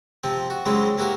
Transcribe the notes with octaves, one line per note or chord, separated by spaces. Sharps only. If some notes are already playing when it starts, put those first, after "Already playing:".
C3 F3 C4
F#4
C#3 F#3 G#3 C4 E4
A#3 E4 F#4 G4 A#4